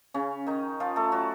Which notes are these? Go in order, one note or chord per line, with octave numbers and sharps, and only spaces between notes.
C#3 C#4
D#3 D#4
F3 F4
A3 A4
F#3 F#4